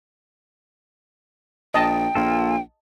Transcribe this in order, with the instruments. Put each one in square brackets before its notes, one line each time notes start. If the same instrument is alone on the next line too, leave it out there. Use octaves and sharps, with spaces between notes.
[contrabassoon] A#1 [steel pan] D#5 A5 [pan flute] G5
[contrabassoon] A#1 [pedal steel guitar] A#3 F4 A4